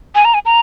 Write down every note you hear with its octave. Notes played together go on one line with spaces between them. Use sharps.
G#5
A#5
G#5
A#5